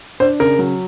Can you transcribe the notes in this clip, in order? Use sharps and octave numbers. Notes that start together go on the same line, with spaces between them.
D4 C5
C#3 A#4
F#3